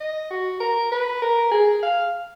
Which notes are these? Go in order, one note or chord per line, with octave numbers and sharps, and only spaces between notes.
D#5
F#4
A#4
B4
A#4
G#4
F5